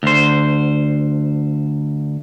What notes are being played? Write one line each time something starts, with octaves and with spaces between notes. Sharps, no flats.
D2 C5